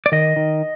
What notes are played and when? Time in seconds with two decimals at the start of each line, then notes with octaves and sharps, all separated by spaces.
0.06 D5
0.12 D#3 D#5
0.36 D#3